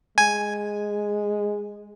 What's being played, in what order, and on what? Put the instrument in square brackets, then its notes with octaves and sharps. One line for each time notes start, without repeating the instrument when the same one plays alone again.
[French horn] G#3 [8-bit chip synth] G#5